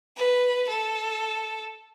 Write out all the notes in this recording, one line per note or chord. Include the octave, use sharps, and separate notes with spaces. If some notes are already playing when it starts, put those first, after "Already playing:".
B4
A4